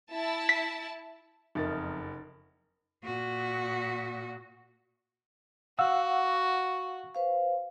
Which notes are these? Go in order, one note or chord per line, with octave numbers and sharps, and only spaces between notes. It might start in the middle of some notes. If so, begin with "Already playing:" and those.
E4 A5
B6
F#1 F2 D#4 A#4 E5 A6
A#2 F#4
F#4 F5 F#5 E6
B4 C5 F5